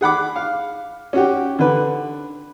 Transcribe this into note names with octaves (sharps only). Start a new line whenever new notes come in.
G#4 F#5 B5 D6
F5
C#4 F#4 G4
D3 B4